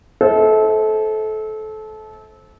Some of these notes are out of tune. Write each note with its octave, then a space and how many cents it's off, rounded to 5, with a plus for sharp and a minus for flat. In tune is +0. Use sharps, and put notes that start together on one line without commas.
A4 -25 C5 +15 E5 -45